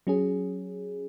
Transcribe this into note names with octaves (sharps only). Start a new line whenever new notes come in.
F#3 C#4 G#4